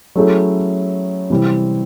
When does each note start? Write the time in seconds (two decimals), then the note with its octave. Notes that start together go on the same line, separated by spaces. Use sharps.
0.16 F#3 A3 C#4 E4 G#4
1.30 C3 E3 G3 C4